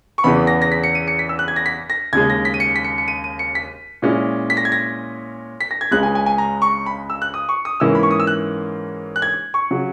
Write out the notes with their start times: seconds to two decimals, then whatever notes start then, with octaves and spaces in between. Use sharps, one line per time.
0.18 C#6
0.24 E2 C#3 E3 B3 B5
0.47 A#6
0.62 A#6
0.72 B6
0.84 C#7
0.95 D#7
1.08 C#7
1.19 B6
1.29 E6
1.39 F#6
1.48 G#6
1.56 A#6
1.66 B6
1.90 A#6
2.13 D#2 C#3 G#3 G#6
2.30 A#6
2.45 B6
2.54 D#7
2.60 C#7
2.76 B6
2.84 C#7
2.98 C#7
3.08 D#7
3.24 D#7
3.39 C#7
3.55 B6
4.02 A#2 G#3 C#4 E4
4.50 B6
4.57 A#6
4.65 G#6
4.72 A#6
5.61 B6
5.71 A#6
5.81 G#6
5.91 C#2 C#3 G#3 F#6
6.03 G#5
6.15 G#5
6.26 G#5
6.38 A#5
6.62 C#6
6.86 B5
7.10 E6
7.22 F#6
7.34 D#6
7.49 C#6
7.65 D#6
7.80 G#2 E3 A#3 C#4 E4 E6
7.95 B5
8.03 C#6
8.11 D#6
8.20 E6
8.27 F#6
9.16 F#6
9.22 G#6
9.54 C#6
9.71 C#3 F#3